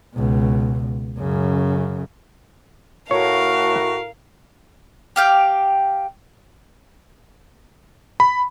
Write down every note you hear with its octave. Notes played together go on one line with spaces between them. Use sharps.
C#2 B2
F#2 C#3
A2 F#4 A#4 C#5 F5
G4 F5 G5
B5